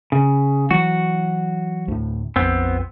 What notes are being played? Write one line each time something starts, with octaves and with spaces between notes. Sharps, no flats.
C#3
E3 F#3 F#4
D2 A2
A#1 F2 B3 C4